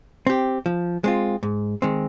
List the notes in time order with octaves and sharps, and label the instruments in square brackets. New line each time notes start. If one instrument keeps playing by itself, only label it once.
[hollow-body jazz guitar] C4 G4
F3
G#3 C4 F4
G#2
D#3 G#3 C4